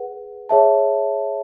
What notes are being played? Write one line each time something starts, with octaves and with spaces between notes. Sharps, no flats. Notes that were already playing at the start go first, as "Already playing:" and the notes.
Already playing: G#4 B4 F#5
G#4 C#5 E5 A5